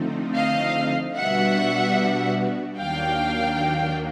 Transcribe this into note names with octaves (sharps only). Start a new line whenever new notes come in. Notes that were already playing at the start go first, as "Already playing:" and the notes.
Already playing: D3 F3 A3 C4 D#4
D#5 F5
B2 G3 B3 D4 F#4 E5 F#5
D#2 D#3 F#3 A#3 D4 F5 G5